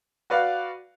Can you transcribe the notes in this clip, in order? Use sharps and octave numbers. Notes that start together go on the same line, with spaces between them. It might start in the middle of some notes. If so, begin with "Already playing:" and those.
F#4 B4 D5 F5